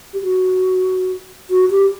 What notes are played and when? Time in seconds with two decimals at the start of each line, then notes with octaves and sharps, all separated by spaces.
0.13 G4
0.22 F#4
1.50 F#4
1.71 G4